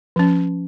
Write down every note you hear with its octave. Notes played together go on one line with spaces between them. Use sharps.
F3 C#4